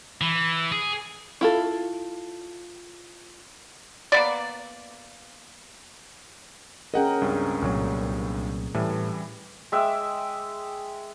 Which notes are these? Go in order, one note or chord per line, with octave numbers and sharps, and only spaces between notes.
E3
G#4
E4 F4 A4
A#3 B3 D5
C#4 G#4 A#4 D#5 F#5 G5
C#2 G2 C4
C2 A#2 F#3 A3
A2 E3 G3
G#3 E5 G5 D6